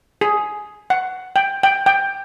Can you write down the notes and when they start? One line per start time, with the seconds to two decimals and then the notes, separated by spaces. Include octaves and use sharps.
0.21 G#4
0.90 F#5
1.36 G5
1.63 G5
1.86 G5